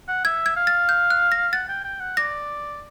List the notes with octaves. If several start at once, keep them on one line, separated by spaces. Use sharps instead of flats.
F#5
E5 G#6
G#6
F5
A6
G6
F#6
A#6
F#5 A6
G5
G5
F#5
D5 A#6